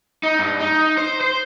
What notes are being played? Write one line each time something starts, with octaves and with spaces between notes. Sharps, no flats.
D#4
G2
D#4
C5
C5